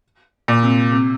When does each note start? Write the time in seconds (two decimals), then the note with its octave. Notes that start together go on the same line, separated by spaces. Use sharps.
0.48 A#2
0.63 C3
0.92 C3